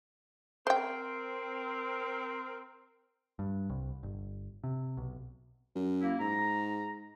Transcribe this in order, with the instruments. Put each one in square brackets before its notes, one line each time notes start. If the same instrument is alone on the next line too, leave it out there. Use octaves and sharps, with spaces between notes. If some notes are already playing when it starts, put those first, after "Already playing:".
[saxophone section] C4 A#4 [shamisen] C5 G5
[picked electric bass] G2
C2
G1
C3
B1
[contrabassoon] F#2
[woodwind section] A#3 E4
[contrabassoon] G#2 [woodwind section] A#5